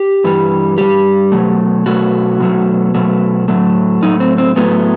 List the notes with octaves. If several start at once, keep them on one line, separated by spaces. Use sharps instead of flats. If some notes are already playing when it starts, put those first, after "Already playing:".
Already playing: G4
G2 E3 G3
G2 E3 G3 G4
B2 F#3 A3
B2 F#3 A3 F#4
B2 F#3 A3
B2 F#3 A3
A2 F#3 A3
A2 F#3 A3 D#4
C4
C4
A2 F#3 A3 B3